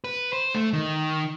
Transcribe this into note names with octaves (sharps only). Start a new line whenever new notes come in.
B4
C5
A3
D#3